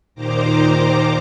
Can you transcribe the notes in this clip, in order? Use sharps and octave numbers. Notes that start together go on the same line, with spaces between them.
D#2 A#2 D#3 C5 A#5 D6